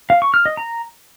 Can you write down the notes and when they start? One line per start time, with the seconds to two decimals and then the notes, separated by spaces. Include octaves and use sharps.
0.10 F5
0.22 C#6
0.34 F6
0.46 D#5
0.57 A#5